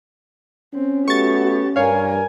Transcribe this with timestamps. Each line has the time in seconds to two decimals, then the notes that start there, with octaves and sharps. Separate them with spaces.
0.74 C4 C#4
1.08 A3 B3 F#4 G4 C#6 A6
1.76 G2 A#4 C#5 F5 G#5